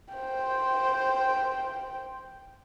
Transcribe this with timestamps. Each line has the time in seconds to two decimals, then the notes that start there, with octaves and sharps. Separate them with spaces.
0.14 C5 G5